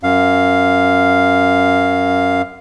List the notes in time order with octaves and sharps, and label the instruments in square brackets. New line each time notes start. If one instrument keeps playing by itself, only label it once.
[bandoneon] F#2 F5